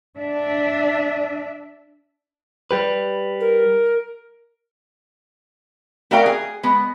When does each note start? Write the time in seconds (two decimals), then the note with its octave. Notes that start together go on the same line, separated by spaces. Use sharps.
0.17 D4 E5
2.71 G3 G4 B4
3.40 A#4
6.11 A3 F#4 A#4 D5 F5 G5
6.26 G#4
6.63 G#3 B3